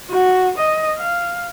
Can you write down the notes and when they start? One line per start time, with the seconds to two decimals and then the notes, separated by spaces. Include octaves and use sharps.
0.11 F#4
0.58 D#5
0.98 F5